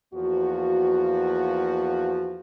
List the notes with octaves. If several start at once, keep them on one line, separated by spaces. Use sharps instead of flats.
E2 F3 A#3 F#4